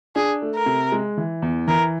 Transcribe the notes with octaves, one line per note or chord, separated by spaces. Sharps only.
D4 G#4
A3
A#4
C3
G#3
E3
E2
E3 A#4